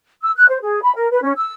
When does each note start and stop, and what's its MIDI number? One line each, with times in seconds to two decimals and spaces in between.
0.22 0.31 88
0.36 0.46 90
0.49 0.59 72
0.62 0.79 68
0.82 0.94 83
0.96 1.08 70
1.11 1.20 71
1.22 1.32 61
1.37 1.53 88